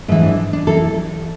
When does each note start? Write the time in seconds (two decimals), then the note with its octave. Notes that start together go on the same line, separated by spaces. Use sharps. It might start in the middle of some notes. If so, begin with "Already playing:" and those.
0.08 G#2 E3 A3
0.23 D4
0.53 D4
0.67 E3 A4